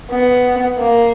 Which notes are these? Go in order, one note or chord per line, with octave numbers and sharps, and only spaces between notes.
B3
A#3